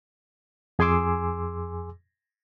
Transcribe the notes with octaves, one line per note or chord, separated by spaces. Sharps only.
F2 G#4 G#5 C6 D6 E6